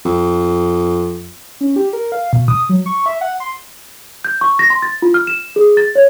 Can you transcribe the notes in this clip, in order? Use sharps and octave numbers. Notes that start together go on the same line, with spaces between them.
F2
C#4
G4
A#4
F5
B2
D#6
F#3
C#6
E5
F#5
C6
G6
C#6
A#6
C6
A6
F4
F6
E7
G#4
A6
C#5